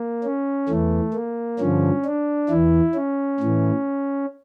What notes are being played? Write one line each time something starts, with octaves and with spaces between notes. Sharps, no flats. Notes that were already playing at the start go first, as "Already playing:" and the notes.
Already playing: A#3
C#4
E2 E3 A3
A#3
G2 D3 F3 C#4
D4
E2 E3 E4
C#4
A2 E3